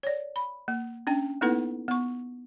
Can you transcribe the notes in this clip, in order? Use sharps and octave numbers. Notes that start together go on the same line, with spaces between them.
C#5 D5
B5
A#3
C#4 D4 G5
A#3 B3 D#4 E4 A4 B4
B3 C#6